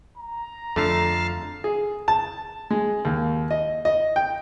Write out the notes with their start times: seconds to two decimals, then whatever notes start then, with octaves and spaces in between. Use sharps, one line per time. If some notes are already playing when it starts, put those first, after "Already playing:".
0.18 A#5
0.76 F2 D3 A3 F5 A5
1.64 G#4
2.08 A5
2.70 G#3
3.05 D#2
3.51 D#5
3.85 D#5
4.16 G5